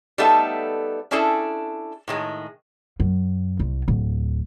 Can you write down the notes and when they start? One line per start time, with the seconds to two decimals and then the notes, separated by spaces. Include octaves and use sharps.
0.18 G3 A3 B3 D#4 A4 E5
1.11 C#4 D4 E4 G#4 A4
2.08 A2 D#3 G#3
3.00 F#2
3.59 C2
3.88 D1